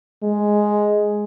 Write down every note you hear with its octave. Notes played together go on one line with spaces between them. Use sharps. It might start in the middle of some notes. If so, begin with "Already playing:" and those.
G#3